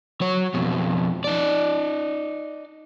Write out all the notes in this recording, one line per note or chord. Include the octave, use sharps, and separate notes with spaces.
F#3 C#5
F2 B2
D#4 D5